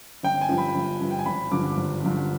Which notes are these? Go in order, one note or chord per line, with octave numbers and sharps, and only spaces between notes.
G1 G5
G#5
G2 F3
B5
G1
G2 F3
G5
G#5
G#1 B5
G2 D3 F3 D6
G#1
G2 D3 F3